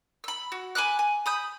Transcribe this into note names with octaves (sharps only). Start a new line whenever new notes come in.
B5 E6
F#4
G#5 B5 D6 F#6
G#5
B5 D#6 G6